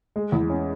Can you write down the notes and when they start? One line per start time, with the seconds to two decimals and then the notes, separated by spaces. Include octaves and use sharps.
0.16 G#3
0.32 E2
0.50 C#4